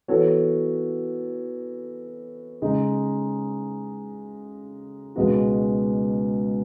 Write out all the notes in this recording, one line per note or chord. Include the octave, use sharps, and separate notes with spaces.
E3 B3 F#4 A4 C#5
C#3 G#3 D#4
C#2 B2 G#3 B3 F#4